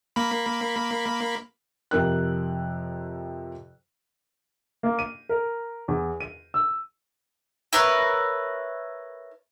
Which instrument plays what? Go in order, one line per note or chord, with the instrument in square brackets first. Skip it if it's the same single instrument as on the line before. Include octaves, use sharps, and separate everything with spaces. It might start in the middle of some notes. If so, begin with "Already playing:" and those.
[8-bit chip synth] A#3 B5
[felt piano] F2 C3 A#4 F#6
[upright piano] A#3
D#7
A#4
E2
D#7
E6
[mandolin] E4 A#4 B4 C#5